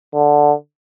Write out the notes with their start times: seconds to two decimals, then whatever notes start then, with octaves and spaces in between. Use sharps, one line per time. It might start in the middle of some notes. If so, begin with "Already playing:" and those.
0.14 D3